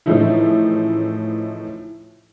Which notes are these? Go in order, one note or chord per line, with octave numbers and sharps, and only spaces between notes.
A2 C#3 E3 F3 D#4 E4